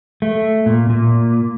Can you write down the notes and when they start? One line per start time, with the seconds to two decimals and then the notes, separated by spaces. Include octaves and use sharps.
0.22 A3
0.66 A#2
0.90 A#2